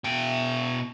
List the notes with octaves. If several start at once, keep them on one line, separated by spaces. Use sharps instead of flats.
B2 G5